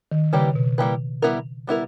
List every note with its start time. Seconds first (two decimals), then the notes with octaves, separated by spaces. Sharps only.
0.12 D#3
0.33 C#3 G3 A#3 E4 G4 B4
0.55 B2
0.78 G3 A#3 E4 G4 B4
1.22 G3 B3 E4 A#4
1.67 G3 B3 E4 A#4